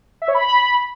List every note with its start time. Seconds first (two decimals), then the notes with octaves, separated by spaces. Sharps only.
0.22 E5
0.28 C#5
0.35 B5